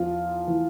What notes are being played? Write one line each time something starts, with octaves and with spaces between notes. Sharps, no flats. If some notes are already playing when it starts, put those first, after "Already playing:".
Already playing: E2 F3 F4
E3